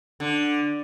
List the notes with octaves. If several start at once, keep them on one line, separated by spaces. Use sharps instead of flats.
D3